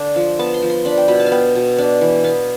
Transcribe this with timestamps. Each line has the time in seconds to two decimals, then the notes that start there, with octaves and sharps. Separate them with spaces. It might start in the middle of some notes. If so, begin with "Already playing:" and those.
Already playing: D3 D4
0.16 F3
0.39 B3 A5
0.54 C6
0.62 F3
0.70 C6
0.85 D4 B5
0.97 G5
1.08 B2 B5
1.20 A5
1.26 F5
1.32 B3 G5
1.55 B2
1.78 D4
2.01 E3
2.24 B3 F5